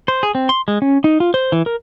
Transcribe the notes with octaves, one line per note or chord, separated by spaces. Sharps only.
C5
G#4
C4
C6
G#3
C#4
D#4
F4
C5
E3
A#4